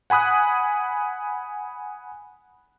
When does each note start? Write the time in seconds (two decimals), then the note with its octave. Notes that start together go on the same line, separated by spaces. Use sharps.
0.10 F#5 G#5 B5 D#6 F#6